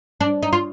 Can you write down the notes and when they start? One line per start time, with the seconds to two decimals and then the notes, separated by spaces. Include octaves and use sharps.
0.21 D4
0.43 D#4
0.53 F4